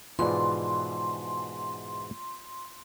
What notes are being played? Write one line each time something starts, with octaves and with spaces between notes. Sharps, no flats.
G#2 B2 E3 F4 D5 C6